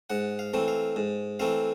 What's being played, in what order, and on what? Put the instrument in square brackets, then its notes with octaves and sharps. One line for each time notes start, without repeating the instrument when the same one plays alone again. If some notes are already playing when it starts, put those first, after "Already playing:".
[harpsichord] G#2 F#5
F5
E3 A3 C4
F5
G#2
E3 A3 C4 F5